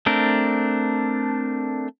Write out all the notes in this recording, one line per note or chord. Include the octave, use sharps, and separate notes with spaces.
A3 C4 D4 A#4